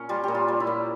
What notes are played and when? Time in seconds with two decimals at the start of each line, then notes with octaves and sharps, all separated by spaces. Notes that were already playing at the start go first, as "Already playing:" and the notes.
Already playing: A#2 C#4
0.09 G3 F4
0.23 A#2 G4
0.35 F4
0.48 G3
0.60 E4
0.67 A#2